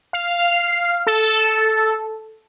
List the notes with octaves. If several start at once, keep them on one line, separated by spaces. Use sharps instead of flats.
F5
A4